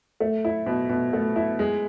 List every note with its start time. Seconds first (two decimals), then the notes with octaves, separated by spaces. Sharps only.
0.20 A3
0.45 E4
0.66 B2
0.90 B2
1.13 A3
1.36 E4
1.59 G#3